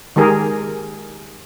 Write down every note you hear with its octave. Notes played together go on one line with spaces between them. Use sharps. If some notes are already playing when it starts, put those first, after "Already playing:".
D#3 G#3 G4 G#4 A#4